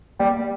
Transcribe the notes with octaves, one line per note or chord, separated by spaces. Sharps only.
G3 A#3